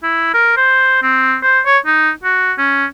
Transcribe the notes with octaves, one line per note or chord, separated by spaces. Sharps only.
E4
A#4
C5
C4
C5
C#5
D#4
F#4
C#4